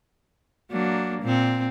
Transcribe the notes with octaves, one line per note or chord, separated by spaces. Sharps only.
F#3 A#3 D4
A#2 C4